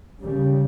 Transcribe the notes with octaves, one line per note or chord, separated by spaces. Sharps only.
D#2 C#3 G3